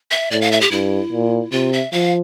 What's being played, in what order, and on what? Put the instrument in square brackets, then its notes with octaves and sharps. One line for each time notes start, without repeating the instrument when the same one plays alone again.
[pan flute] E5
[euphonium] A2 [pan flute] D5
[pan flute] F5
E5
G4
[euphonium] G2 [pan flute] E4
[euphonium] A#2
[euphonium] C3 [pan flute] F4
[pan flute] E5
[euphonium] F3 [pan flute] F5